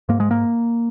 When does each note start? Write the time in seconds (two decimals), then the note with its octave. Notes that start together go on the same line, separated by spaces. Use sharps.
0.09 G#2 A#3
0.20 G#3
0.31 A#3